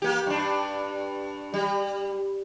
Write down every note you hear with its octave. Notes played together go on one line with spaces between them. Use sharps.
A#3 G4
G2 D4
G3